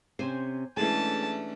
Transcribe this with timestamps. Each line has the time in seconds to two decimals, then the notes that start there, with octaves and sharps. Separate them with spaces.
0.19 C3 C4 C#4 C5 G#5
0.77 E3 G#3 A3 C#4 D4 G#4 A4 A5